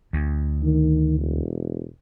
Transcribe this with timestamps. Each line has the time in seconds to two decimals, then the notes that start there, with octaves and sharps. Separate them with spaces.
0.13 D2
0.62 D#3
1.18 E1